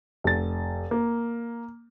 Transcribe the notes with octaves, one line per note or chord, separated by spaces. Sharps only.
F1 A6
A#3